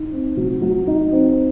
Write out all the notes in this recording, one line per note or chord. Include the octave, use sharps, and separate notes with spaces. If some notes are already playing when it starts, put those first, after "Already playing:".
Already playing: D#4
C4
F#3
F#3
D#4
C4